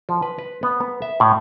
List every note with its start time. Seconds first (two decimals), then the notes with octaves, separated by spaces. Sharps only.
0.09 F3
0.22 B4
0.38 B4
0.63 B3
0.81 B3
1.02 E5
1.20 A2